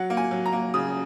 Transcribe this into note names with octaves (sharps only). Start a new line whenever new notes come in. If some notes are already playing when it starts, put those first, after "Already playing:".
Already playing: F#3 F#5
A#3
G#5
F#3
A#5
A#3
C#3 D#6